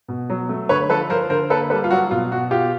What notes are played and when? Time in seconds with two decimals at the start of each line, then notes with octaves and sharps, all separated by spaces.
0.08 B2
0.30 F#3
0.49 A3
0.69 D3 B4 C#5
0.89 F3 A4 B4
1.10 F3 A#4 C5
1.30 D3 A#4 C5
1.50 A#3 A4 B4
1.70 G3 A4 B4
1.84 F4
1.91 F#3 F#4
2.11 B2 F4
2.31 B2 F#4
2.51 F4 G4